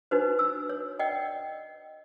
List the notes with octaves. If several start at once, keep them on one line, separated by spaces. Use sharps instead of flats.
D4 D#4 F#4 B4 C5
E6
C#5
D5 D#5 F#5 G5